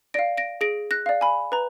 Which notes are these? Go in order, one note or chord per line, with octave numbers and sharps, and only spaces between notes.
D5 F5 A#6 D7
A#6 D7
G#4 A#6 D7
F#6 A#6
D5 F5
G#5 B5
B4 A#5